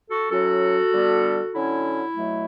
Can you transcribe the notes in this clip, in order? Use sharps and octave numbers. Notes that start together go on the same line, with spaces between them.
F#4 A4
A2 F#3 C#4 F#4 A4
D3 G3 B3 D4
D3 F#3 C#4 E4
B2 F#3 A3